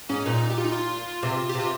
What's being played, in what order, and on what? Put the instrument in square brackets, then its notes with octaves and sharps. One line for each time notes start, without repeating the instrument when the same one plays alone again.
[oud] G#2 [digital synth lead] C#4
[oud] A#2 [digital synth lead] D#4
[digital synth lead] G4
F4
D#4
F4
[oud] C3
[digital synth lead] G4
[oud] C3 [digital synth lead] F4